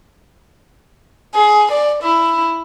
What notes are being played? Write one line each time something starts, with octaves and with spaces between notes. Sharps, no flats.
G#4
D5
E4